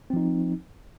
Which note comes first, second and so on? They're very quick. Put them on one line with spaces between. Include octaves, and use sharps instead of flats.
C4 F3 D#4